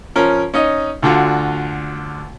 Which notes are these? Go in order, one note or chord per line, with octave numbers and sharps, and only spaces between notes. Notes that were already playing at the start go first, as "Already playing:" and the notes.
F3 C#4 A#4
C#4 D#4 D#5
D2 D3 F4 F#4